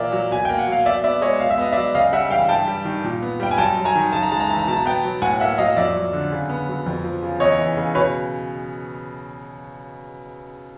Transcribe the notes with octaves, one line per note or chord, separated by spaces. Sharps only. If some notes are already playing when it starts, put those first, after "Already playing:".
Already playing: A#2 E3 A#3 D5 E5
F#3
B2 G#5
A#3 G5
F#5
F#3 F5
B2 D5 E5
B3 D5 E5
G#3 C#5 D#5
B2 F5
E5
B3 D#5
D5 E5
F#3
C#3 D#5 F5
G3 E5 F#5
E3 F5 G5
G2 G5 A5
G3
D#3
A#2
B3
G3 G5
G#5
F#2 G5 A5
F#3
G#5 A#5
D#3
C#3 A5
A#5
G#3 A5
A#5
E3 A5
A#5
B2 A5
A#5
B3 G5 A5
F#3
A2 F#5 G#5
A#3 E5 F#5
F#3 D#5 F5
F2 D5 E5
F#3
D3
C#3
B3
F#3
F2
F3
C#3
E2 C#5 D#5
E3
C#3
B2 B4 C#5